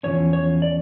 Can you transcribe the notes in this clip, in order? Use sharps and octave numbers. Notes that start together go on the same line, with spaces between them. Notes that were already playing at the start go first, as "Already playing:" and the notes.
E2 C#3 F3 C#4 C#5
C#5
D5